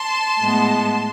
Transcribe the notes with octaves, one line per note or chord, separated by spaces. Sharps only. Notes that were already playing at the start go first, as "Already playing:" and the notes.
Already playing: A5 C6
A2 G#3 B3